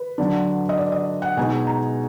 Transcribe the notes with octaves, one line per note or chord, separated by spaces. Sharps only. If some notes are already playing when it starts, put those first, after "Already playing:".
Already playing: B4
D3 F#3 D4
D#5
D5
D#5
F#5
B2 G#3 D#4 G#5
A#5